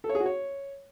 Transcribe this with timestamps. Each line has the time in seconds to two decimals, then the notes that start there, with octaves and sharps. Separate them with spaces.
0.04 A4
0.09 C#5
0.15 G#4
0.20 F#4
0.26 C#5